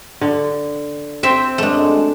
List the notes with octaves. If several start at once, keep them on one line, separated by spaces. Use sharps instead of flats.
D3
C4 C5 E5 G5
F#2 G#3 A3 D4